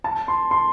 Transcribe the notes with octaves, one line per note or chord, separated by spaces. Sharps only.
A5
C6
C6